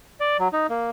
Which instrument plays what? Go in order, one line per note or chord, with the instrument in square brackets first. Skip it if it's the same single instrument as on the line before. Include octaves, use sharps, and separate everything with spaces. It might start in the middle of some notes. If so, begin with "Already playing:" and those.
[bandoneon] D5
F#3
D#4
A#3